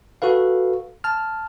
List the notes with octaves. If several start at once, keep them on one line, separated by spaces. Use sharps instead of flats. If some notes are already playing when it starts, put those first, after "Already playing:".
F#4 A4 B4 F5
A5 F6